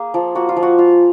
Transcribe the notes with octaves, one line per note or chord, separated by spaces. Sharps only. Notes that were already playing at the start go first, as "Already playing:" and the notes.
Already playing: A#3 G#4
F3
A#3 F#4
F4
F3
F#4
F4